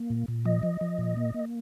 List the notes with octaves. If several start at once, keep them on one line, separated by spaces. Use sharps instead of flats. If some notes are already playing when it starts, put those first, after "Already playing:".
Already playing: A#3
A#2
A#2
F3 D#5
F3
F3
A#2
A#3
A#3